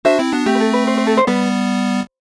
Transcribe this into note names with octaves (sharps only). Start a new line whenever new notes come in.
D4 F#4 C5 E5
C4 E4
B3 D4 F#4
A3 C4 G4
B4
A4
B4
C5
C5
A4
C5
G3 B3 B4